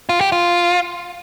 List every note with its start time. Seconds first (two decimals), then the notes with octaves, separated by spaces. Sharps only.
0.09 F4
0.21 G4
0.32 F4